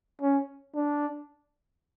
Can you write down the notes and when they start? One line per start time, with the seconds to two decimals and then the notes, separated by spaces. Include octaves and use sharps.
0.22 C#4
0.74 D4